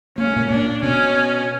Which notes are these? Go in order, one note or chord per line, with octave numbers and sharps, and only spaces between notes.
A#3 C#4
A3
A#2 A#3
A#2 A#3 D4
B2 B3 C#4